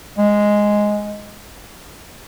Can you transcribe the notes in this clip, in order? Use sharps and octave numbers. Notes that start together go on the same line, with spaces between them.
G#3